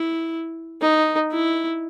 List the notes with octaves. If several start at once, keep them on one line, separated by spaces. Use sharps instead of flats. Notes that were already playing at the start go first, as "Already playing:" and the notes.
Already playing: E4
D#4
E4